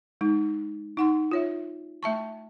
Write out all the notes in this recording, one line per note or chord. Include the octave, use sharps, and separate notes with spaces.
G#3 D#4
D#4 F#5 C6
F4 C#5 E5
A3 E5 A5 C#6